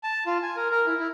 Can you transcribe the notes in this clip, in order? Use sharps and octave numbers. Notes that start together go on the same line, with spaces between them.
A5
F4
G#5
A#4
A#4
E4
E4